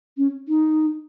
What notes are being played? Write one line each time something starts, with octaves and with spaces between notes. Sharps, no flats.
C#4
D#4